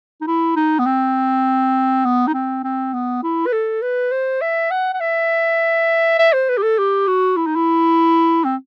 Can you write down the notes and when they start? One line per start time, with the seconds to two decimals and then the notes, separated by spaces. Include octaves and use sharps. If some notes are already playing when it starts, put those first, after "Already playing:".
0.21 D#4
0.27 E4
0.56 D#4
0.79 B3
0.86 C4
2.05 B3
2.27 D#4
2.34 C4
2.64 C4
2.93 B3
3.23 E4
3.46 B4
3.52 A4
3.82 B4
4.12 C5
4.41 E5
4.71 F#5
4.94 F#5
5.00 E5
6.19 E5
6.33 C5
6.49 B4
6.58 G4
6.63 A4
6.78 G4
7.07 F#4
7.37 E4
7.46 D#4
7.55 E4
8.44 C4